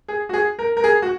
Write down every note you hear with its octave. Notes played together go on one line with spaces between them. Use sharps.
G#4
F#4
G#4
A#4
A#4
G#4
F#4